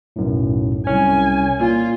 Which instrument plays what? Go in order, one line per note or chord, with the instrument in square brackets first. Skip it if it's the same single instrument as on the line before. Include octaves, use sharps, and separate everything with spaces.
[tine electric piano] B1 F#2 A2
[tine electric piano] C2 C#4 [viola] G#5
[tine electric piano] A#2 [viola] F4